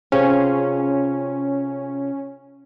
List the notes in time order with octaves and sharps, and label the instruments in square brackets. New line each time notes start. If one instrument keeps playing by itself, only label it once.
[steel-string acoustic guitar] C3 F4 G#4 [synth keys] C#4